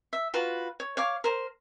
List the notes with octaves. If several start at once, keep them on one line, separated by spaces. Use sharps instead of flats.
E5
F4 F#4 B4
C#5
C#5 F5 D6
A#4 C5